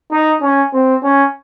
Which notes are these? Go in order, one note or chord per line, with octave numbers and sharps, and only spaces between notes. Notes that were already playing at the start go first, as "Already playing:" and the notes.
D#4
C#4
C4
C#4